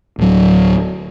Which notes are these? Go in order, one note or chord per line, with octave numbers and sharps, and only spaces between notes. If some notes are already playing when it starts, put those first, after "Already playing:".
D1 F#3